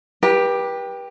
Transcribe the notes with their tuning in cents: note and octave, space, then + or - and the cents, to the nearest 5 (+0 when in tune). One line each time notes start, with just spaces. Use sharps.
G4 +10 B4 -35